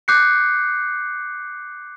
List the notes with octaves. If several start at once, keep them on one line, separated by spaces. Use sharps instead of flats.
D6 F#6 G6 C7 C#7